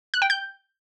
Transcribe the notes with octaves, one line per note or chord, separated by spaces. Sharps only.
F#6
G5
G6